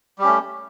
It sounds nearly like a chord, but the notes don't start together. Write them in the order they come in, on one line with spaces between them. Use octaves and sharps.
G3 G4 C#4 A3